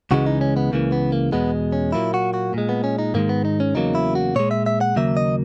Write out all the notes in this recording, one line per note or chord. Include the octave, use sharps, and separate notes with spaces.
C#2 C#3 E3 G#3 F#4
D#4
C#4
B3
C#2 C#3 E3 A#3
B3
A#3
E2 B2 G#3 B3
C#4
A#2 F#3 A#3 E4
F#4
F#4
A#2 G#3
B3
C#4
D#4
G#2 D#3 G#3 A#3
B3
D#4
C#4
E2 C#3 F#3 A#3 D#4
E4
F#4
A#2 G#3 C#5
E5
E5
F#5
D#2 C#3 F#3 A#3 E5
D#5